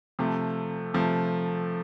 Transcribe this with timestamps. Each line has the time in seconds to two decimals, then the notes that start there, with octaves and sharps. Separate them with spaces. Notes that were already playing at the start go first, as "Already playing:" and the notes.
0.19 C3 F3 A3
0.94 C3 F3 A3